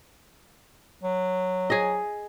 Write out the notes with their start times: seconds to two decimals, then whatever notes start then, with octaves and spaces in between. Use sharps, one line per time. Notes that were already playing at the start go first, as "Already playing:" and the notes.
1.03 F#3
1.70 G#4 D#5